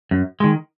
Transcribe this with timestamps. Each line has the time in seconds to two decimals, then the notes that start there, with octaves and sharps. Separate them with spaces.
0.11 F#2
0.40 D#3 G#3